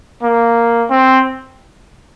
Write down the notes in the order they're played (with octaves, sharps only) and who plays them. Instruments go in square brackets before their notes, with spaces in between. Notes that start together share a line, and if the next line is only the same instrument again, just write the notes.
[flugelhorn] A#3
C4